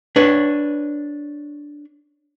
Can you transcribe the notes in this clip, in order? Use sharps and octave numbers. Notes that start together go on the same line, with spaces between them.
D4 B4 C#5